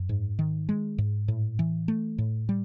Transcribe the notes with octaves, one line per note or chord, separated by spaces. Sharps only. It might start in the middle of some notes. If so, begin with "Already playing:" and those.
Already playing: F#2
G#2
D#3
G#3
G#2
A2
E3
A3
A2
G3